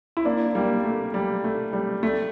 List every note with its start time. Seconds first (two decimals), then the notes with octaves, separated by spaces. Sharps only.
0.17 E4
0.25 A#3 D4
0.55 G3 A#3
0.84 A3
1.14 G3
1.44 A3
1.73 G3
2.03 A3